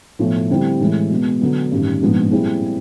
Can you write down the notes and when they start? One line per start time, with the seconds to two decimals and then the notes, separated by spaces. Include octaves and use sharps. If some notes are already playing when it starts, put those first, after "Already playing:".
0.19 B1 A2 F3 A3
0.50 D3 G3 C4 E4 G4
0.80 A2 E3 G#3
1.10 B2 G#3 B3
1.41 D3 F#3 B3
1.71 A1 G2 D#3
2.01 A#1 G#2 F3 G#3 B3
2.31 A#2 G3 C4 E4 G#4